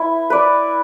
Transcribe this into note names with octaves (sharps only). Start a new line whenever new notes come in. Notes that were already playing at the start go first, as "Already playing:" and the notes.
Already playing: E4 B4
B4 D5